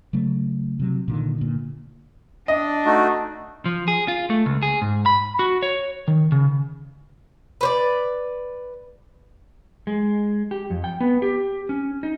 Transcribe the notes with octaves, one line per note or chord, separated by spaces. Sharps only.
C#3 F#3 A3
C3 F#3
A#2 D3 D#3
A#2 D3
D4 D#5
A3 D#4 F#4
F3
G#4
F4
A3
C#2
G#4
G#2
B5
F#4
C#5
D#3
C#3
B4 C5 D5
G#3
G4
F2
G5
B3
G4
C#4
D#4